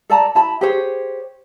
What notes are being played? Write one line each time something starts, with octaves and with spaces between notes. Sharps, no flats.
A4 D5 A5 A#5
E4 A5 B5
G4 G#4 C5 C#5